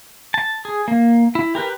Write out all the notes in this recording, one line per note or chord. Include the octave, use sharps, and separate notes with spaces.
A5
G#4
A#3
E4
G4 A#4 B4